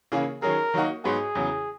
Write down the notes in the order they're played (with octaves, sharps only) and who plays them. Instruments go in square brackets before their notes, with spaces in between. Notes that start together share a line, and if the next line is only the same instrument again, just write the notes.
[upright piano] C#3 E3 A#3 C#4 G#4
[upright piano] D#3 F#3 C#4 G#4 [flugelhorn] A#4
[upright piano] D#3 F#3 A#3 D#4 F#4
[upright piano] G#2 F#3 B3 F#4 [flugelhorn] G#4
[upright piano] E2 C#3 F#3